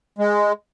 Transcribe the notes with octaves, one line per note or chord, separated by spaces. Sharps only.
G#3